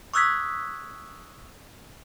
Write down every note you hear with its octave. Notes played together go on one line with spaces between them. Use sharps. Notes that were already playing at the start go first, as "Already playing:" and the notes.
C#6 D#6 E6 F#6 G#6 B6